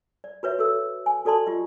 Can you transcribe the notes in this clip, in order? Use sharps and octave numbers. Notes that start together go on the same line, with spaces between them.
D5
F#4 B4 C#5 E5
F#4 A4 E6
G#5
F#4 A4 D5 A5 C6
F4 G4 D#5